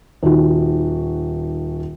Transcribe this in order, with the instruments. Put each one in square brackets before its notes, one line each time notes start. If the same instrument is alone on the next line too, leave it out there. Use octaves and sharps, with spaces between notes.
[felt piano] D#1 D#3 F#4